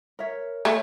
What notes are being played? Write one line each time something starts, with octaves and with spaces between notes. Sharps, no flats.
A#4 C#5 E5
A3 A#4 C#5